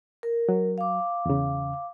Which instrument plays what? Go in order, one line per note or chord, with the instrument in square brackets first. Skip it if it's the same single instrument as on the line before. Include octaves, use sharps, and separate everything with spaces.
[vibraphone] A#4
[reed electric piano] F#3
[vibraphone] F5 D6
[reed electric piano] E2 C#3